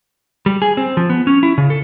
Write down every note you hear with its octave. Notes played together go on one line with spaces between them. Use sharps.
G3
G#4
C4
F3
B3
C#4
E4
C#3
A4